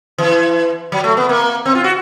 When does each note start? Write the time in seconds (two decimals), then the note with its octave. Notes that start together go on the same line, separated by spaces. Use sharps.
0.18 E3
0.92 F#3
1.04 A3
1.17 B3
1.29 A#3
1.66 C4
1.75 F4
1.84 F#4